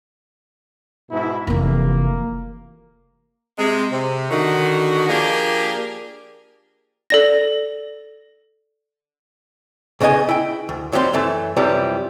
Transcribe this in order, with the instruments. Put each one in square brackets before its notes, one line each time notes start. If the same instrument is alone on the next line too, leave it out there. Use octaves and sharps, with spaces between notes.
[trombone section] G#2 B2 E4
[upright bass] F1 E3 [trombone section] A#3
[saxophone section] C3 G#3
C3
D3 D#3 F#4
F3 A#3 D4 G4 G#4 A#4
[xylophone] A4 D5 A#6
[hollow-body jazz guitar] B1 C#3 B3 D#5 G#5
E4 G5
D2
D#2 F#3 G3 C4 C6
F#2 E3 A3
F#2 C3 E3 F3 G3